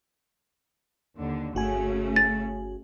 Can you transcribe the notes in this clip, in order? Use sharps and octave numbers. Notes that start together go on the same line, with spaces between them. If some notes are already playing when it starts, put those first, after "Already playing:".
D#2 D3
G1 C#3 A3 C#4 F#4 G#5
A6